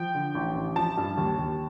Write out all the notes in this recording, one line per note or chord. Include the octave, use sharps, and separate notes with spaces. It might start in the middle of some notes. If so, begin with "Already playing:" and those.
Already playing: F3 G5
D3
A1
A1
F3 A5
G2
D#2
D#2